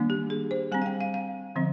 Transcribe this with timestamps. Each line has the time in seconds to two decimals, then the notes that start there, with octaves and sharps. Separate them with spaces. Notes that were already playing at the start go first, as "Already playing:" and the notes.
Already playing: D#3 G3 A#3 D4
0.10 G4
0.30 G#4
0.51 C5
0.72 G3 C4 G#5
0.82 F5
0.86 G5
1.00 F5
1.14 F5
1.56 D3 F3 C4